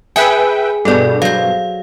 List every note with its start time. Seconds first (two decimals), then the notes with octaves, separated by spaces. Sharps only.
0.16 G#4 B4 E5 G5 G#5
0.85 G2 B2 A4 D5
1.22 F#3 C5 F5